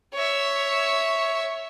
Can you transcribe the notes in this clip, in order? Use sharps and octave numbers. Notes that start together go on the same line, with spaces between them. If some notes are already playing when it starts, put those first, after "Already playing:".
C#5 E5